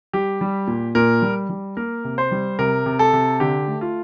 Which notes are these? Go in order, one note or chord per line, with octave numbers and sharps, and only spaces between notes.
G3 G4
G3
A#2
A#2 A#4
G3
G3
A#3 A#4
C3
C5
G3
C3 A#4
C3
A4
C3
D3 G4
A3
F4